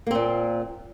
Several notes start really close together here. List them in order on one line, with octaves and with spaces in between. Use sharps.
A#3 C4 A#2